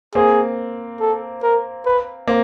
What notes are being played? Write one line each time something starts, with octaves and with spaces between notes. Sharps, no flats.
A#3 C4 G#4
A4
A#4
B4
A#3 C4